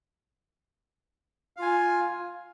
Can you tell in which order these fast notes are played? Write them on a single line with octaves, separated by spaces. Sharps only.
F5 F4 G#5